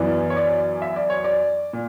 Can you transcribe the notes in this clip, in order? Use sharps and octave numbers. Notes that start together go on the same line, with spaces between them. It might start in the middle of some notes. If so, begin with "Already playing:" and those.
Already playing: F#2 E3 B3 D5
C#5
D5
E5
D5
C#5
D5
A#2